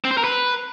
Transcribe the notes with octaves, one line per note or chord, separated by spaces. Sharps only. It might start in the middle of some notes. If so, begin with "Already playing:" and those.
C4
C5
A#4
B4